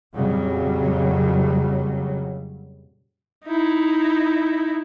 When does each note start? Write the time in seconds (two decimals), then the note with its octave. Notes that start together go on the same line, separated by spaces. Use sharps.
0.12 F2 A#2 C#3 F#3 G3
3.45 D#4 E4